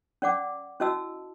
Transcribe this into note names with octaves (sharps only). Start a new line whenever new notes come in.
C#4 D5 F#5 D6
C#4 E4 F#4 D#5 A5 E6